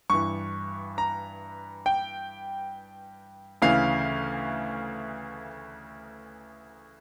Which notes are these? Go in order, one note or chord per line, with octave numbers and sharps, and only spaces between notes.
G2 E3 C#6
A#5
G5
D2 C#3 E3 F5